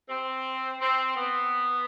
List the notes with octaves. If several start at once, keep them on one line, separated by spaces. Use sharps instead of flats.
C4
C4
B3